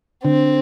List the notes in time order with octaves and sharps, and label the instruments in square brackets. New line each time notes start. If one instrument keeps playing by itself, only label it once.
[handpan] D3 [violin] C4